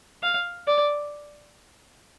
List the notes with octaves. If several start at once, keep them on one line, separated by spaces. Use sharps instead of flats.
F5
D5